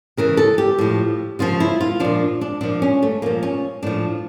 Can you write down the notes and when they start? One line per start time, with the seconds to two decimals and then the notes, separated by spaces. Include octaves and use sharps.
0.17 C#3 E3 A#4
0.37 A4
0.58 G4
0.78 A2 F3
1.39 C#3 F3 F4
1.60 E4
1.81 F4
2.00 A#2 F3 D4
2.41 D4
2.61 A#2 F3 D4
2.82 C#4
3.02 A3
3.22 A#2 F3 A#3
3.43 C#4
3.83 A2 F3 D4